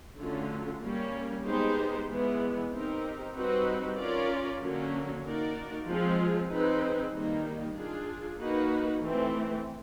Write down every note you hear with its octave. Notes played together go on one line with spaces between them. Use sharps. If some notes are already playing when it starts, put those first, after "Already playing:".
D3 F#3 A3 C#4 F4
G3 A#3 C#4
G#3 B3 D#4 G4 C5
E3 G#3 B3
C4 D#4 G4 A#4
G3 C4 D#4 F#4 B4
C#4 F4 A#4 D5
D3 F#3 A#3 C#4
A#3 D#4 F#4 A#4 D5
F3 G#3 C4 F4 G#4
C4 D#4 G#4 B4
D#3 G3 A#3 D#4
D4 F4 G#4
A#3 D#4 F#4 B4
E3 A3 C4